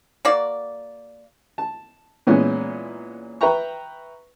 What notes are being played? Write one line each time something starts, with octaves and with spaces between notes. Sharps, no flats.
A#3 F#4 D5
A5
A#2 E3 G#3 B3 C#4
B4 E5 G5 A#5 C#6